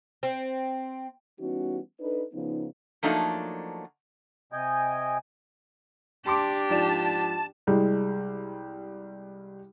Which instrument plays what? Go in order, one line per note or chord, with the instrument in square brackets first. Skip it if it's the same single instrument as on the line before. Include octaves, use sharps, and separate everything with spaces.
[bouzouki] C4
[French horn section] E3 G3 B3 C#4 D#4 F#4
D4 D#4 A4 B4
C#3 F3 B3 D#4
[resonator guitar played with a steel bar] F3 F#3 A3 A#3 D4 D#4
[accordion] C3 D#5 G5 G#5
[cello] D4 G4 [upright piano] A5 C6 D6
[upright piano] G#2 F3 D5 [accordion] A5
[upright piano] C2 G3 G#3